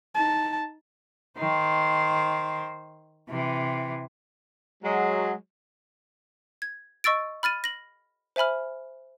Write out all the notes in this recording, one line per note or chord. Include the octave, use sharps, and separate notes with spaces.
D#4 A5
D#3 C5
C3 E3
F#3 G#3
G#6
D#5 C#6 E6 A6 D7
B5 F6 A6 D#7
A#6 F#7
C5 E5 G#5 B5 F6